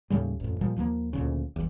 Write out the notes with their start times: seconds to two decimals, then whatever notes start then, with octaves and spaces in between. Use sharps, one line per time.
0.10 D#2 A2 C#3 G3
0.40 A1 F2
0.61 A#2 F3 G3
0.76 D#2 F3 A3 A#3
1.13 D2 A#2 C#3
1.56 G1 E2